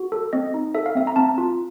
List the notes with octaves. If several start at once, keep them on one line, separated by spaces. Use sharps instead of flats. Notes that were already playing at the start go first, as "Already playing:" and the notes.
Already playing: F#4
A4
C4 D#5
D#4
A4 E5
F5
C4 E5
A#5
C4 A5
F4